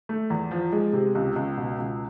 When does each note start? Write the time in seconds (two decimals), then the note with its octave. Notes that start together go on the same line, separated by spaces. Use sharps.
0.09 A3
0.30 E2
0.51 F3
0.72 G#3
0.93 C3
1.15 C#2
1.36 C#2
1.57 B2
1.79 C#2